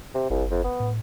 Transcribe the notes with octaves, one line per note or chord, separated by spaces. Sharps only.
C3
G1 C2
F2
B3
A2